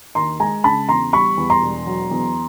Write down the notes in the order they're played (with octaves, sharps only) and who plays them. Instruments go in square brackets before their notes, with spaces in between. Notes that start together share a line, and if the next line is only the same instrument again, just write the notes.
[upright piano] D#2 A#5 C6
G#3 G#5 A#5
C#3 A5 B5
E2 A#5 C6
G3 B5 C#6
E2
A#5 C6
E1
F#3
E2